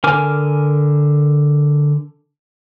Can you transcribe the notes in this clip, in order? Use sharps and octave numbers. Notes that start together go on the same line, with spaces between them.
D3 A#4 G#5 D6 F6